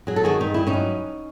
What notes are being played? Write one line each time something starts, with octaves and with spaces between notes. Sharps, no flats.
F#3 G#4
A4
D#3 F#4 G#4
G2 D#4
G2 E4
C#4 D#4
F#3